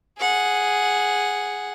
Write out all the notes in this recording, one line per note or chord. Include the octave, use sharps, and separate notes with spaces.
G#4 F#5